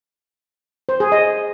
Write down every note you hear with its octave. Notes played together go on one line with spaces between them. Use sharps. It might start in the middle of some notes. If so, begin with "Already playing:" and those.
C5
G#4
D#5